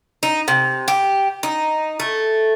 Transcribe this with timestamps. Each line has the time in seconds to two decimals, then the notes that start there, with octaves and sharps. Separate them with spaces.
0.23 D#4
0.48 C3
0.88 G4
1.43 D#4
2.00 A3